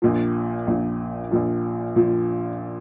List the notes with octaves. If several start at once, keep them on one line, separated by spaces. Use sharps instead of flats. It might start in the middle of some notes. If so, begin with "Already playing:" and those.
A#1 A#2 F3
A#1 A#2 F3
A#1 A#2 F3
A#2 F3